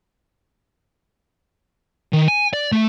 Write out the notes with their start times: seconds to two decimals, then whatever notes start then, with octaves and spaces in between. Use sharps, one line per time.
2.13 D#3
2.28 G#5
2.53 D5
2.72 A3